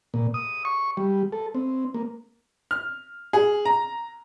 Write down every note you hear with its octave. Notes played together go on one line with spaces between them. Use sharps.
A#2
D#6
C#6
G3
A4
C4
A#3
F6
G#4
A#5